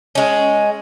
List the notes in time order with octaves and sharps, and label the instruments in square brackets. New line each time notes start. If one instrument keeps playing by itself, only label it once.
[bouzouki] G#3 C#4